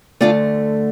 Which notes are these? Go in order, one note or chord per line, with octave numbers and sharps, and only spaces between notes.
D2 D3 A3 D4 F4